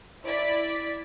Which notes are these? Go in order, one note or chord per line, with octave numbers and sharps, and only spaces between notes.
E4 D5 B6